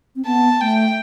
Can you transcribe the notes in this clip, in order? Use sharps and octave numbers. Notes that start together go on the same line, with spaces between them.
C4
B3 A5
A3 G5